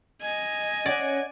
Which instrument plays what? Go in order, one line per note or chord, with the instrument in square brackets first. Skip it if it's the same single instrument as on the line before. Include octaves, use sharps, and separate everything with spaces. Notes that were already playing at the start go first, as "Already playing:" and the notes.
[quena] D#5 [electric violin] G#5
[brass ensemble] C#4 F#5 [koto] D5